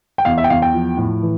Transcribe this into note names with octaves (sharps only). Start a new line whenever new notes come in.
G5
E2 F5
E5
G5
E2 F5
G5
F3
A2
E3